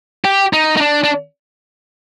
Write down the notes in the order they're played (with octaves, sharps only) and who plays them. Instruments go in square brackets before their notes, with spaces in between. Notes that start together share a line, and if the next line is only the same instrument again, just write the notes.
[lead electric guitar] G4
D#4
D#4
D4
D4